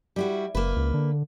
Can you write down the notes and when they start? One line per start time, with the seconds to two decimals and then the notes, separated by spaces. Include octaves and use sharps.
0.16 G3 E4 F#4
0.55 F#1 A#3 B4
0.76 C#2
0.94 D3